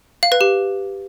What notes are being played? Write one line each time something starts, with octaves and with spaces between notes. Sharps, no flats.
F5
B4
G4